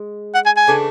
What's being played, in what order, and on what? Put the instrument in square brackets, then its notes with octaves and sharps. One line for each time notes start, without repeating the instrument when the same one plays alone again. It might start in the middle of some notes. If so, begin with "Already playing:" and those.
Already playing: [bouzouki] G#3
[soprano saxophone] F#5
G#5
G#5
[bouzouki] C#3 E3 A3 D4